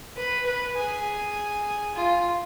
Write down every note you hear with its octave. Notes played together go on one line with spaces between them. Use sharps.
B4
B4
G#4
F4